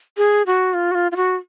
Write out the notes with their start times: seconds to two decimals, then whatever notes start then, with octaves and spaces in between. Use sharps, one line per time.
0.17 G#4
0.46 F#4
0.74 F4
0.91 F#4
0.95 F4
1.12 F4
1.16 F#4